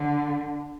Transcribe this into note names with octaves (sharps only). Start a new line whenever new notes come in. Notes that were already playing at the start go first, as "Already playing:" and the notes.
Already playing: D3